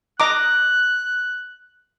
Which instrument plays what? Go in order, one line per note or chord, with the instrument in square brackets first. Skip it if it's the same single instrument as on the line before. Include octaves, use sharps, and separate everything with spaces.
[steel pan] D#5 A#5 D6 [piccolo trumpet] F#6